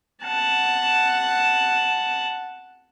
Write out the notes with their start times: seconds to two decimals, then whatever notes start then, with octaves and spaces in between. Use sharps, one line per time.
0.24 F#5 A5